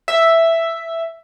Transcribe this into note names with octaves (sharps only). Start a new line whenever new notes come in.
E5